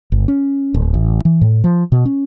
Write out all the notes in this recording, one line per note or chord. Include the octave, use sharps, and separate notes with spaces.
G1
C#4
D1
A1
E3
A2
F3
B2
C#4